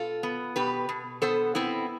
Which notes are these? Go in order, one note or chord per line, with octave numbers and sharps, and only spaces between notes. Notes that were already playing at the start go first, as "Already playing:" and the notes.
Already playing: B2 F4 A4
B3
B2 G4 B4
B2
B3 A4 C5
B3 C4 E4